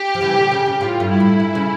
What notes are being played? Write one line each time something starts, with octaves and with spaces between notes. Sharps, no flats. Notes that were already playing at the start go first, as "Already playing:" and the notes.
Already playing: G4
F3
C#3 E3
A#2 D3
C#3
C#3
A2 F4
G2
E4
A2
A#2
C#3